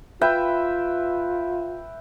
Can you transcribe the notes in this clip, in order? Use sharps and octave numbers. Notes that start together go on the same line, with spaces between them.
F4 B4 E5 G5